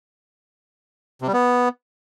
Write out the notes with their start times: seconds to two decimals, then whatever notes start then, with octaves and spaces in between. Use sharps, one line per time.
1.22 C3
1.28 G3
1.33 B3